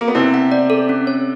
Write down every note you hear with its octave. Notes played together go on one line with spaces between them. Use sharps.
A#3
B3
C3 C4 E4
F#5
D5
A4
C#4
C#5